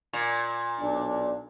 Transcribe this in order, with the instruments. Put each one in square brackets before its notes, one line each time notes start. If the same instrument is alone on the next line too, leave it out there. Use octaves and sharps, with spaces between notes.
[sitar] A#2
[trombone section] B1 D4